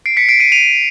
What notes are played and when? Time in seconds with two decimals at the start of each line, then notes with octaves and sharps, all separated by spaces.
0.06 C7 D7
0.17 B6 C#7
0.29 C7 D7
0.40 C#7 D#7
0.52 D#7 F7